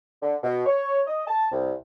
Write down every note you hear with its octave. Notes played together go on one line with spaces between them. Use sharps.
D3
B2
C#5
D#5
A5
C2